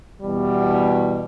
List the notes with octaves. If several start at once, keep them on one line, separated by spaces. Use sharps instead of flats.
E2 B2 G3